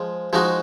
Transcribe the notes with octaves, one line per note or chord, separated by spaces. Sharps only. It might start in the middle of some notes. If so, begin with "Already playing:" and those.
Already playing: F3 G#3
F3 G#3 D#4 F#4